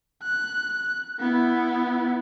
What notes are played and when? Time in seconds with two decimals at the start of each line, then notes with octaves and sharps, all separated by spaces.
0.23 F#6
1.19 B3 E4